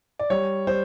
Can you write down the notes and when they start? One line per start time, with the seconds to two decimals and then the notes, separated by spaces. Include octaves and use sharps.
0.19 D5
0.30 G3 C#5
0.67 G3 C5